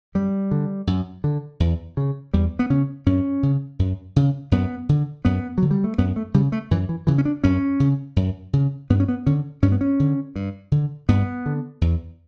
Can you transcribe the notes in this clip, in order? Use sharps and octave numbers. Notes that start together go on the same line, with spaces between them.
F#2 G3
D3
F#2
D3
E2
C#3
E2 G3
B3
C#3 C#4
F#2 C#4
C#3
F#2
C#3
F#2 B3
D3
F#2 B3
D3 F#3
G3
A3
F#2 B3
A3
C#3 G3
A3
F#2 E3
E3
C#3 E3
C#4
D4
F#2 C#4
C#3
F#2
C#3
G2 B3
C#4
B3
D3 C#4
G2 C#4
B3
C#4
D3
G2
D3
G2 B3
D3
E2